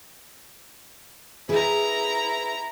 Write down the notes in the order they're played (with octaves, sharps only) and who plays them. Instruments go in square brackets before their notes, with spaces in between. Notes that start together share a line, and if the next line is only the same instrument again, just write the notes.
[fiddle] E4 A#5 [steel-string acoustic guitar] G#4 B4